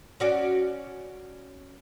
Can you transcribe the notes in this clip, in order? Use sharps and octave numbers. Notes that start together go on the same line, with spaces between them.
C#4 F#4 D5